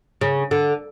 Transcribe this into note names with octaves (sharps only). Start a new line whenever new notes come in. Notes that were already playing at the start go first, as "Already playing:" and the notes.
C#3
D3